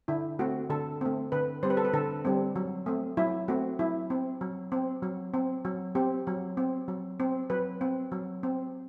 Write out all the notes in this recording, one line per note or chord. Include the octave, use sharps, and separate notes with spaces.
D3 E4
A3 C4 F#4
D3 A4
A3 C4
D3 B4
G3 C4 C5
B4
A4
B4
D3 A4
G3 C4
F#3
A3 C4
F#3 E4
A3 C4 F#4
F#3 E4
C4
F#3
C4
F#3
C4
F#3
C4 G4
F#3
C4
F#3
C4
F#3 B4
C4
F#3
C4